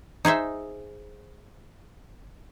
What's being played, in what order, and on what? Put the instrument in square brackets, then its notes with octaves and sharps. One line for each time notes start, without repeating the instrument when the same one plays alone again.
[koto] D#4 G#4 C5 E5